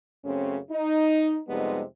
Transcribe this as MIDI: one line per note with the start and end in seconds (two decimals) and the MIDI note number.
0.25 0.58 42
0.25 0.58 49
0.25 0.58 57
0.25 0.58 60
0.25 0.58 61
0.70 1.38 63
1.48 1.82 41
1.48 1.82 48
1.48 1.82 55
1.48 1.82 56
1.48 1.82 59
1.48 1.82 63